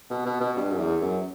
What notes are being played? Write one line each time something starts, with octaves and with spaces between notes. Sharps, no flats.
B2
B2
B2
G2
F#2
E2
F#2